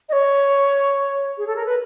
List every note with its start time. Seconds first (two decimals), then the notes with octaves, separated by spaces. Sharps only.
0.09 D#5
0.13 C#5
1.38 G#4
1.47 A4
1.56 A#4
1.66 B4